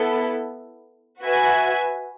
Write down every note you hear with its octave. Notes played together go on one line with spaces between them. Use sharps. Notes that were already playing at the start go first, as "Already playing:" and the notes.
Already playing: B3 E4 A4
F#4 B4 E5 G#5